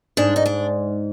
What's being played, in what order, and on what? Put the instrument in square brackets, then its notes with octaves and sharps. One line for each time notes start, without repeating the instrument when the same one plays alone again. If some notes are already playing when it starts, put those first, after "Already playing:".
[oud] G#2 [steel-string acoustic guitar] D4
[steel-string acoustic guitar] D#4
D4